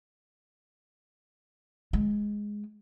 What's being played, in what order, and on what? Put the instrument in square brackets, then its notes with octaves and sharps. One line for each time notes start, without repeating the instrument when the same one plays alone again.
[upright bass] G#3